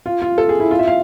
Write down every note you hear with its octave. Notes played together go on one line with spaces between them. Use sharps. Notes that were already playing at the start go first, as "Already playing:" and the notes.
F4
F4
A4
G#4
E4
F4
E5
F5